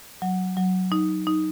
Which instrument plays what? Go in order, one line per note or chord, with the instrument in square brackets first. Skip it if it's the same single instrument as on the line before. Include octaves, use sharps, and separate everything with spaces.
[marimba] F#3
F#3
D#4
D#4